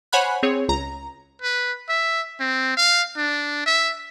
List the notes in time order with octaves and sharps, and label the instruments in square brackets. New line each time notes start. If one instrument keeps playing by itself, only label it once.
[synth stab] C5 C#5 F#5 G#5 B5 F#6
C4 G#4 C#5
C#2 A#5
[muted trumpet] B4
E5
C4
F5
D4
E5